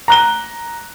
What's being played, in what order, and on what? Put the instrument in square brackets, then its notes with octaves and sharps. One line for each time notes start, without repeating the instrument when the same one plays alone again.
[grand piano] A#5 F#6 G7